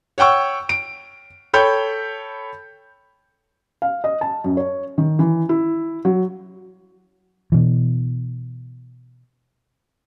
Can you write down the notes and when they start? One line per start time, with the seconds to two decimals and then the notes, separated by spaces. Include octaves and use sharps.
0.18 C#5 F#5 G5 C#6 E6
0.69 D7
1.53 A4 C#5 G5 B5 G6
3.82 F5
4.04 D#5
4.21 A5
4.44 F#2
4.57 C#5
4.98 D#3
5.19 E3
5.49 E4
6.05 F#3
7.52 B2 E3